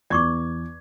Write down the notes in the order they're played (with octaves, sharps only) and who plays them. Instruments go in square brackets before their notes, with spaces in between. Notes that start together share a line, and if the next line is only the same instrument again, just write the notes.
[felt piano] E2 G#6 [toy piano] D5 C#6 D6